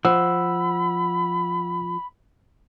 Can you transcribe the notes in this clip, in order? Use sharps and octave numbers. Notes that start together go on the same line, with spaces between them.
F3 F#5 B5 E6